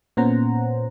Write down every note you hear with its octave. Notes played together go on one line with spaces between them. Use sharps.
A#2 B3 C#4 C5 F#5 A#5